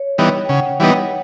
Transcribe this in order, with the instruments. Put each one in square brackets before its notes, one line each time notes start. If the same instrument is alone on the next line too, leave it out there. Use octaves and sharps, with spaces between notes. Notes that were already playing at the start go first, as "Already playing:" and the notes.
Already playing: [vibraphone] C#5
[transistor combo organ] E3 G3 B3 D#4
[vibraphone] G5
[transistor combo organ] C#3 [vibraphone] F#5
[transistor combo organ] E3 G3 B3 D#4